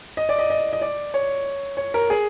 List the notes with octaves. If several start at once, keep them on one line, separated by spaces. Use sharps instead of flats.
D#5
D5
D#5
D#5
D#5
D5
C#5
C#5
A#4
G#4